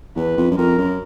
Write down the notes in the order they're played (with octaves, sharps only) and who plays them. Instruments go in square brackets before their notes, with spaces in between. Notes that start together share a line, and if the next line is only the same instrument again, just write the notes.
[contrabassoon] E2 [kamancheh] B4
[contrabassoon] F2
F#2
[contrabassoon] F2 [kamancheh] A#4
[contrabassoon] F#2